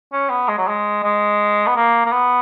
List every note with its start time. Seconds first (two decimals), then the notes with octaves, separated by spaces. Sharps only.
0.12 C#4
0.30 B3
0.48 G#3
0.58 F#3
0.68 G#3
1.03 G#3
1.67 B3
1.76 A#3
2.06 A#3
2.12 B3